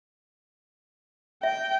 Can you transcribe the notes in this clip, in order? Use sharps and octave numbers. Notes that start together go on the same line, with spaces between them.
E5 G5